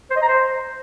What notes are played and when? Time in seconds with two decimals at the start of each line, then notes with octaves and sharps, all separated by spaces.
0.11 C5
0.16 D#5
0.22 A#5
0.28 C5